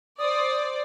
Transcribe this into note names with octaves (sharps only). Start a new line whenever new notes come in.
C5 D5 D#6